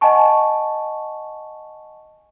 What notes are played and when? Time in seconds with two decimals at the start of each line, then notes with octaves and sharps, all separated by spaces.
0.01 D#5 F#5 G#5 A5 C#6